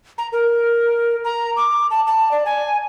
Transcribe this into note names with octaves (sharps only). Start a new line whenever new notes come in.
A#5
A#4
A#5
D6
A5
A5
D5
G#5